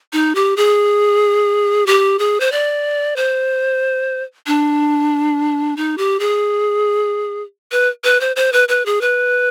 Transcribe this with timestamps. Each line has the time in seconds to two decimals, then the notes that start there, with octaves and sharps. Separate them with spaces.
0.13 D#4
0.35 G4
0.57 G#4
1.87 G4
2.19 G#4
2.40 C5
2.52 D5
3.16 C5
4.47 D4
5.77 D#4
5.98 G4
6.20 G#4
7.72 B4
8.04 B4
8.20 C5
8.36 C5
8.53 B4
8.68 B4
8.86 G#4
9.01 B4